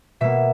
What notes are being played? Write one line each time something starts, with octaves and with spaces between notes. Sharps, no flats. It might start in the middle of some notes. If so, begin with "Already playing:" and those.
B2 A#3 E5